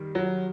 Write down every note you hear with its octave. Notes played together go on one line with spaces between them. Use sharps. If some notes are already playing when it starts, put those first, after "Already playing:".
Already playing: D#3 G3
F#3